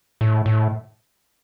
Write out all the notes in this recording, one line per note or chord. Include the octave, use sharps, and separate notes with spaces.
A2
A2